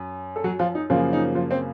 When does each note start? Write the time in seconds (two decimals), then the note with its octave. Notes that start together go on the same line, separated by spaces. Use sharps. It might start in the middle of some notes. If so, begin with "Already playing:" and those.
Already playing: F#2
0.36 A4
0.44 F#3 F#4
0.59 F3 F4
0.75 D#4
0.90 F#2 C#3 F3 A#3 F4
1.13 D#4
1.35 F3 F4
1.51 C4 C5